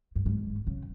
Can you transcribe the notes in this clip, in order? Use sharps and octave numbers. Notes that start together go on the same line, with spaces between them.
G2
G#2
C#3